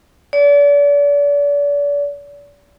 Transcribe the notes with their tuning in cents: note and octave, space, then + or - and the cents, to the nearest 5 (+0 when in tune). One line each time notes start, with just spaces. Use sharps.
D5 -40